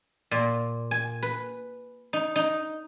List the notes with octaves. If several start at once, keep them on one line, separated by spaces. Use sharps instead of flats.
A#2
G#5
B4
D#4
D#4